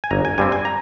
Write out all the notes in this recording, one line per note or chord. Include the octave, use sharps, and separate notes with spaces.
G#5
G1 A#5
G#5
G2 G3 C4 G#5
G#5
A#5